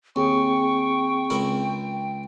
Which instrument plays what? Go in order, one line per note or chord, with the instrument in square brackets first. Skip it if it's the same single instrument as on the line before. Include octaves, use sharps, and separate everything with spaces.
[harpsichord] D#2 [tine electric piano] C4 G#4 [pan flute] G5 [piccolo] C#6
[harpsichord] C#2 E4 A#4